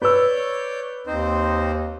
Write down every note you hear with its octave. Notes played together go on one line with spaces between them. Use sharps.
B4 C#5 D5 E6 G6
D#2 C4 D#4 C5